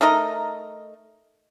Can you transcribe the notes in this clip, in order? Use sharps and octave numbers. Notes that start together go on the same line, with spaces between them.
A3 D#4 A#4 D#5